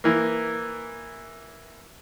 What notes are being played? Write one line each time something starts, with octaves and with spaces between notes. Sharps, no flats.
E3 A#3